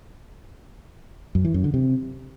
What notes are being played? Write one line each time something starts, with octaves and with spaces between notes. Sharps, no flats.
F#2
E3
F#2
D3
C3